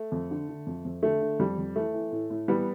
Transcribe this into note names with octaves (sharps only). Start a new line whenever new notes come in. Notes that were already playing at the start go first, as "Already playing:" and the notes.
Already playing: A3
F2
D3
D3
F2
F2
D3 A3
D3
F2 G3
F2
E3 A3
E3
A2
A2
E3 G3 B3